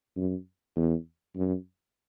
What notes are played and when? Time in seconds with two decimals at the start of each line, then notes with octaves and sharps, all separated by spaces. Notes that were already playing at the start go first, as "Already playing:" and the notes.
0.17 F#2
0.76 E2
1.36 F#2